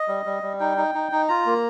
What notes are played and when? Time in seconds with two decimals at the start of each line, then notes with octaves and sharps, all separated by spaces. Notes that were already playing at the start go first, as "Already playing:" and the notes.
Already playing: D#5
0.08 G3
0.25 G3
0.43 G3
0.60 D#4 G5
0.77 D#4
0.95 D#4
1.12 D#4
1.28 F4 A#5
1.46 A#3